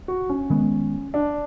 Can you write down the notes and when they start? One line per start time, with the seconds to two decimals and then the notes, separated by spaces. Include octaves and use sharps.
0.08 F#4
0.29 C#4
0.50 D#3 G#3 B3
1.14 D4